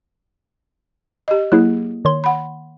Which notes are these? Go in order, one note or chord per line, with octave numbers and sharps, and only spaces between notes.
G4 D#5
F#3 A#3 E4 G#4
D#3 C#5 C6
F#5 B5